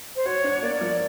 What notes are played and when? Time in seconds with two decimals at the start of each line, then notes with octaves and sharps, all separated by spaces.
0.15 C5
0.26 F#4 C#5
0.44 D4
0.62 A#3 D5
0.81 F3